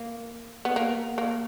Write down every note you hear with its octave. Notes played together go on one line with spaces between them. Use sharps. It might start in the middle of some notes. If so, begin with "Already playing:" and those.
Already playing: A#3
B3
A#3
A#3